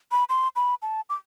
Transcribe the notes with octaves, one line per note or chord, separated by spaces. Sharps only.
B5
C6
B5
A5
D6